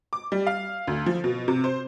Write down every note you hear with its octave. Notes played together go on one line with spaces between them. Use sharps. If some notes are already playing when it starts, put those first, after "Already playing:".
D6
G3
F5
D2
F3
B2
C3
C5